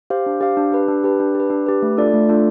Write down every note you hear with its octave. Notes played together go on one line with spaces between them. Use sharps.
G4 C5 F5
D4
G4 C5 F5
D4
G4 B4
D4
G4 B4
D4
G4 B4
D4
G4 B4
A3
D4 F4 A4 D5
A3
D4 F4 A4 D5